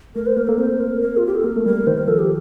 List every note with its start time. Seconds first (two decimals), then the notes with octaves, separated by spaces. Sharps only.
0.15 A3 A#4
0.27 C5
0.37 A#3 A#4
0.47 A#3 A4
0.58 C4 C5
0.80 A#4
1.01 A#4
1.17 F4
1.27 G4
1.35 A4
1.44 A#3 A#4
1.56 A3
1.66 G3 A#4
1.87 D#3 C5
1.97 A#4
2.08 F3 A4
2.19 G4